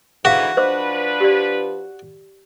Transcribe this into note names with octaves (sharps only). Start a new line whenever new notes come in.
G#2 D3 E3 F#4 G#4 E5 F5
F3 D4 B4 C5 D#5 D6
G4 D5